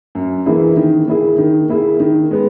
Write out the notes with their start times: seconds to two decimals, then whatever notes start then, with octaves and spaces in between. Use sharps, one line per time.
0.15 F#2
0.46 E3 A#3 E4 G#4
0.77 D#3
1.08 A#3 E4 G#4
1.38 D#3
1.69 A#3 E4 G#4
2.00 D#3
2.31 G#3 B3